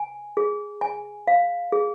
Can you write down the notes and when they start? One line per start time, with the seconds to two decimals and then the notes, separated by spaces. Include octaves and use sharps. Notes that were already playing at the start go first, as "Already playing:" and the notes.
Already playing: G#5
0.37 G#4
0.81 G#5
1.27 F5
1.72 G#4